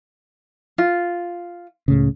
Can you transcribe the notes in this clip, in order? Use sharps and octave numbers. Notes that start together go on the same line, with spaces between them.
F4
C#2 A2 C#3